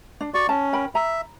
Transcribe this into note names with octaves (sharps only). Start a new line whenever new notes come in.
D4
F#4 D5 C#6
C#4 A5
A#4 G5 B5
E5 A#5